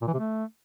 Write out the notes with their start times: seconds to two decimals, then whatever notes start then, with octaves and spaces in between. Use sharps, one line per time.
0.02 A#2
0.08 E3
0.13 C3
0.19 A3